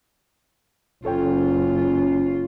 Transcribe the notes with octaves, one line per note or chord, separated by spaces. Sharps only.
F#1 C#4 F4 A4 C#5 G5